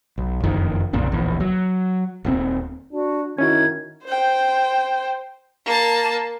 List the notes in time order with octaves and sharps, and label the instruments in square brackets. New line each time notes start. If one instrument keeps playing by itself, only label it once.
[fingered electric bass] B1
F#1 F2 D#3
B1 F2 A#2 C#3
D1 A#1 E2
F#3
D#1 G#2 C4
[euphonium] D4 [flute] F#4
[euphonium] D#3 [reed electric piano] C#4 E4 F#4 [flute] G#6
[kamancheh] C5 G5
[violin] A#3 A5